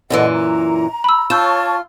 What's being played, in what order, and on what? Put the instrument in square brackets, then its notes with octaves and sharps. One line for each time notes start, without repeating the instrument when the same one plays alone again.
[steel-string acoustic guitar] F#2 A#2 E3 [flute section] A4 D#5 F#5
[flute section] A#5
[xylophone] B5 E6
[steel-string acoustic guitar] F4 [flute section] C#5 A5 C#6 [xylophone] E6 G6 E7